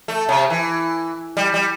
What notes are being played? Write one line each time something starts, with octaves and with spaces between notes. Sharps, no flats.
A3
C3
E3
G3
G3